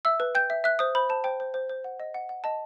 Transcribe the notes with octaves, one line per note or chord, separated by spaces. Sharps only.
E5 E6
B4
G5 G6
E5
E5 F#6
C5 D#6
C5 B5
C5 A5
C5 G5
C5
C5
C5
F#5
D#5
F#5
F#5
D#5 A5